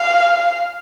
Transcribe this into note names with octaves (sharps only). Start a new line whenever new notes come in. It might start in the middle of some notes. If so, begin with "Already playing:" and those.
Already playing: F5